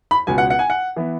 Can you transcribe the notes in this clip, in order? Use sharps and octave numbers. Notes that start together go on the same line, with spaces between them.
B5
C#2 B2 B3 G#5
F#5
F#5
G#5
F#5
E3 B3